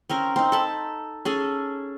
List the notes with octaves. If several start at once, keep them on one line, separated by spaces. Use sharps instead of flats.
C4 C#4 A#4
C4 D#4
A4 A5 B5
C#4 G#4 A4